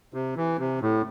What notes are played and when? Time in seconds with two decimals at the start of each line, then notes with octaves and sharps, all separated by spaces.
0.14 C3
0.36 E3
0.59 C3
0.82 A2